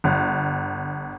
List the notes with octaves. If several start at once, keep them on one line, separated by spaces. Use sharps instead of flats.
G1